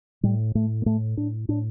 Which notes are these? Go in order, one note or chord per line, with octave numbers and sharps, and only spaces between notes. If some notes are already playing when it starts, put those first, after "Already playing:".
A2 G3
A2 A3
A#3
A2 A3
A2 D4
A2 D4